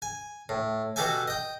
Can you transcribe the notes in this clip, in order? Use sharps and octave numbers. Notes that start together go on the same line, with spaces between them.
G#5
A2
B2 F#4 G4 A4 E5 G#5
D#5 G5